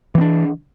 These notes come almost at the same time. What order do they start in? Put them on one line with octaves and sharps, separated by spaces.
E3 C4 D4